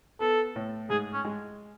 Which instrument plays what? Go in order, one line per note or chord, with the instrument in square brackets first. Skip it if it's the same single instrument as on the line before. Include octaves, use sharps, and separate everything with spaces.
[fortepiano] B3 [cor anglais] A4
[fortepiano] A2
[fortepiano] G#2 [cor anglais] G#4
[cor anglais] C#4
[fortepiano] G#3